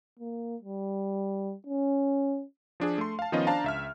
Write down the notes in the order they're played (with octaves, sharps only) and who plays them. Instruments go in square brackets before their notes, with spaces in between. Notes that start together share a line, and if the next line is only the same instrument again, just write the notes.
[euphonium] A#3
G3
C#4
[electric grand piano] F3 D4 G#4
A3 C6
F5 A5
D#3 F3 B3 C#4 F4 D#5
D4 C5 F5 A5 A#5
C#2 E5 F6